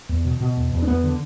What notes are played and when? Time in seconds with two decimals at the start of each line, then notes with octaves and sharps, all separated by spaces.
0.09 E2
0.25 B2
0.40 B2
0.57 E2
0.72 E2
0.82 D4
0.87 E2 B3
1.04 D3